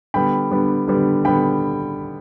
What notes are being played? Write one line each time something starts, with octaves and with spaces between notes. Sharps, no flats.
D3 G3 B3 G5 B5
D3 G3 B3
D3 G3 B3
D3 G3 B3 G5 B5